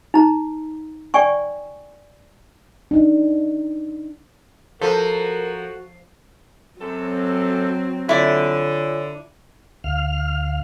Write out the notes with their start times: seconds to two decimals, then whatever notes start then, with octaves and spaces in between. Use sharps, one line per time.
0.14 D#4 A#5
1.14 D5 G5 G#5 C#6
2.91 D4 D#4
4.81 F3 F#4 A4 A#4 C5
6.81 F#2 F#3 C4 A4
8.09 D3 E4 F4 C#5 D5 G#5
9.84 D2 F5 F6